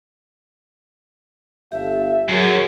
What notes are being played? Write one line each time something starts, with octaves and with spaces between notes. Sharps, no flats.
G1 G4 A4 E5 F5
F#2 F#3 F#4 G#4 A#4